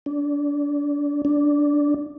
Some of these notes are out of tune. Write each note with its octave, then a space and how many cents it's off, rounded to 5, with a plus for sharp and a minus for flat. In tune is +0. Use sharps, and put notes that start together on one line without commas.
D4 -25
D4 -10